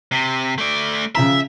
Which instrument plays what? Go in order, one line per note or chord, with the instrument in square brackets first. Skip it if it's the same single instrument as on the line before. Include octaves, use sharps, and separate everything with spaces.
[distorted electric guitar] C3
A3 D5
[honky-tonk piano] C#3 F3 A#5 [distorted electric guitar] E5